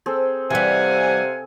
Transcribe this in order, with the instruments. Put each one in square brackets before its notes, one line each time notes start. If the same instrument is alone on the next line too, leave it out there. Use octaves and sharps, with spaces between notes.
[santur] C4 G#4 A4
[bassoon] C3 [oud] E3 G3 [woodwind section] F5 F#5 G#5